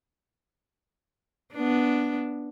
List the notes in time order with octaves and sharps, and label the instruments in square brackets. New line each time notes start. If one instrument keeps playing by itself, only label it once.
[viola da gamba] B3 D4